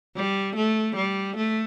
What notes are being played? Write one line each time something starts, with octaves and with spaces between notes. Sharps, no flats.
G3
A3
G3
A3